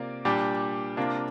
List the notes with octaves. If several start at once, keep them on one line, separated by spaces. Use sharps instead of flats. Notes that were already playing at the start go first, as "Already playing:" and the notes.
Already playing: C3 A#3 F4 D5
A#2 G3 D4 G4
C3 A#3 D4 F4